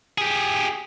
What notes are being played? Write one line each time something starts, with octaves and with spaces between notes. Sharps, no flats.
G4 G#4